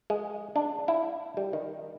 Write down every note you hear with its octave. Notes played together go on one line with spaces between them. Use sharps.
G#3
D4
E4
G3
D#3